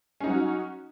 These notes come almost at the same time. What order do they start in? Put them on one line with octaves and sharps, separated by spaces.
C#4 D#4 F#3 F#4